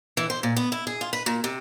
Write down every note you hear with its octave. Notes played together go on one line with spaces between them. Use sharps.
E3
C5
A#2
B3
E4
G#4
F4
B4
A#2
C3